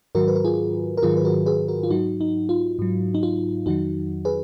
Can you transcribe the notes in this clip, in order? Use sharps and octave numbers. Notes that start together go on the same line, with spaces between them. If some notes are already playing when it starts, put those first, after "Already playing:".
G#2 D#3 F#3 F#4 A#4
B4
A#4
F4 G#4
A#4
G#2 D#3 F#3 F4 G#4
B4
F#4 A#4
G#4 B4
F#4 A#4
F4
G#2 F#3 D#4 F#4
D#4
F4
G#2 F#3
D#4
F4
F2 D#3 F#3 D#4 F#4
G#4 B4